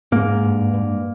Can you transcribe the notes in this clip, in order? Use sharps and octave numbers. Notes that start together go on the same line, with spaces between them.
G#2 A#3
G2
G2